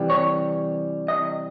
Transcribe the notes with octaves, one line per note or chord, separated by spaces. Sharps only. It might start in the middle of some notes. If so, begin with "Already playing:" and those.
Already playing: C3 E3 G3
C#5
D#5